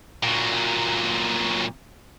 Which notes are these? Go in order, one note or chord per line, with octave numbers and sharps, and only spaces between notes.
A#2 F#3